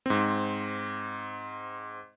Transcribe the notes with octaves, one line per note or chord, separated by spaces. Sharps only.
G#2 C4